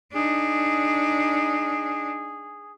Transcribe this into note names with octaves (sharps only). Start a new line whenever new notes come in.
D4 D#4 G#4